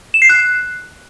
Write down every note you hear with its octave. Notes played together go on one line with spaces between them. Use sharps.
E7
C7
F#6